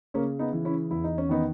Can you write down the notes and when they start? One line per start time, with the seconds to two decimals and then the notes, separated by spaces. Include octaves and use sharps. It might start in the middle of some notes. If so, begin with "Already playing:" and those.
0.14 C#3 A#3 C#4
0.39 B3 D#4
0.53 E3
0.65 C#4 E4
0.91 E2 E4
1.04 D#4
1.18 C#4
1.29 D#3 B3 D#4